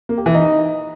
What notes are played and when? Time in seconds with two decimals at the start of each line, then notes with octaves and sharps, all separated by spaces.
0.09 A#3
0.18 G4
0.26 E3
0.34 D#4